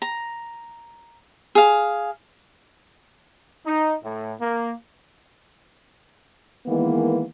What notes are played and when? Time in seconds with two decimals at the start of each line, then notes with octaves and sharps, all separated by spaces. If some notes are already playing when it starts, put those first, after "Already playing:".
0.02 A#5
1.55 G#4 F5
3.64 D#4
4.03 A2
4.40 A#3
6.67 D#3 E3 G#3 A#3 B3